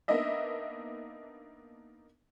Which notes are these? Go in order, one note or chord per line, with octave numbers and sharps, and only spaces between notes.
A#3 B3 D4 D#4 D#5 E5